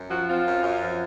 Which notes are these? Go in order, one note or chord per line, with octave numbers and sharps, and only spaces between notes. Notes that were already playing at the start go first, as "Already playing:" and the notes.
Already playing: F#2
F3 F#4
C4 F4
F#2
F#2
F3